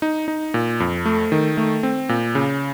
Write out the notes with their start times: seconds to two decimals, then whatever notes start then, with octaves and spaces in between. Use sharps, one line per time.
0.02 D#4
0.28 D#4
0.54 A#2
0.80 F2
1.05 A3
1.32 D#3
1.57 A3
1.83 C4
2.09 A#2
2.35 C#3